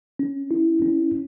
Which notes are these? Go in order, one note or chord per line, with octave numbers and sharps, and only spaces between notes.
C#4
E4
C#4